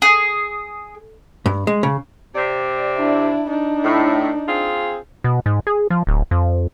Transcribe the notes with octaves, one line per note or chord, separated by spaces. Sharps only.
G#4
G2
G#3
C#3
C3 D5
D4 E4
D4 D#4
A2
C4 F4 G#4
B2
G#2
G#4
F3
D1
F2